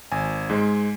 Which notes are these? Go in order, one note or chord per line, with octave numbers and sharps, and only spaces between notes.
G#1 G#5
G#2 G#3